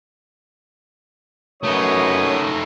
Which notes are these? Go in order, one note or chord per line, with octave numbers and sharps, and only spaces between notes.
F#2 A3 D#4 B4 C#5 D#6